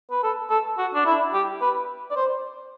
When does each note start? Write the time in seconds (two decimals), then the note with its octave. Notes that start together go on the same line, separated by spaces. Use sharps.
0.11 B4
0.23 A4
0.50 A4
0.78 F#4
0.95 D4
1.06 E4
1.33 G4
1.61 B4
2.11 D5
2.16 C5